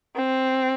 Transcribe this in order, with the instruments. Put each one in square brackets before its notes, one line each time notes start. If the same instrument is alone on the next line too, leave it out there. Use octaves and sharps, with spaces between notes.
[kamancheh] C4